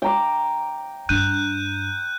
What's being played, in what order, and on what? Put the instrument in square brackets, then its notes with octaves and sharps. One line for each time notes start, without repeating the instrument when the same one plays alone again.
[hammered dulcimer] G5 A#5 D6
[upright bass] G2 D4 [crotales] F#6 G6 D#7